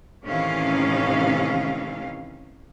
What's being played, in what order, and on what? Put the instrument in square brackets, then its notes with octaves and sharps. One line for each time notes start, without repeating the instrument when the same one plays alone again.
[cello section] A2 C3 D#3 E3 C#4 F5